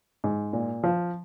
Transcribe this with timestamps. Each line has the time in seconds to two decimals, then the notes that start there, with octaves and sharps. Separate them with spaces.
0.24 G#2
0.53 A#2
0.83 F3